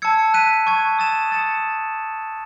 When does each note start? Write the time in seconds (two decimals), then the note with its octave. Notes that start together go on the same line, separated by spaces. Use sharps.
0.02 A5 E6 G#6 C#7
0.34 F#6 B6 D#7
0.66 A5 C#6 G#6
0.99 D#6 A6 E7
1.31 D#6 A6 C#7 E7